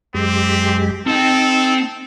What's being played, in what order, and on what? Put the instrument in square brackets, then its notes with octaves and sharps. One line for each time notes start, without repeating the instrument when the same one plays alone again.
[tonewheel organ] F#2 G#3 G4 [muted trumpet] C4
[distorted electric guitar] C4 G5 [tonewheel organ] D#4 [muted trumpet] A4